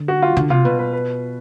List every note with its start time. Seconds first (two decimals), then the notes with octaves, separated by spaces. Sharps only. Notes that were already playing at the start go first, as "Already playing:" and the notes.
Already playing: D3
0.08 F#4
0.22 F4
0.37 D3
0.50 C3 F4
0.65 B2 B4
0.79 B4
0.93 B4